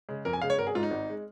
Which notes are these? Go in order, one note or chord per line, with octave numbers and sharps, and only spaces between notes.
C#3 G#3
F2 A#4
G#5
C#3 G#3 F5
C#5
G#1 A#4
G#4
G#2 G#3 F4
D#4
G#1
G#3